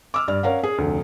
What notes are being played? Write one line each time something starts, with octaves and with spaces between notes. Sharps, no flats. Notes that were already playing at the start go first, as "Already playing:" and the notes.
D6 E6 F6
G2 D5 F6
C#4 A#4 F5 F#5
G#4
F1 D2